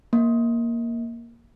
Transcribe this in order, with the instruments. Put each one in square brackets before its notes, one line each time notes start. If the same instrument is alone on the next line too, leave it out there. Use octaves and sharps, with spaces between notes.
[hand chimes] A#3